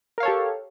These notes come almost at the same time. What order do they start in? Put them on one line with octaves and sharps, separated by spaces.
A#4 F5 C#5 A4 G4